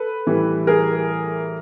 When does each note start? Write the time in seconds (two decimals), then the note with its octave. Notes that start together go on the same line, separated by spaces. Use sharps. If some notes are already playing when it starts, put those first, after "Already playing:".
Already playing: A4 B4
0.27 A2 E3 G3
0.67 G#4 A#4